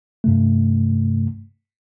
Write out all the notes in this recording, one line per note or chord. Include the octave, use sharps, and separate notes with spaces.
G2 C3 A3